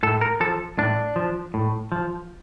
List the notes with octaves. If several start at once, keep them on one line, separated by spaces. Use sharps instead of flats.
A2 A4
A#4
F3 A4
A2 D4
F3
A2
F3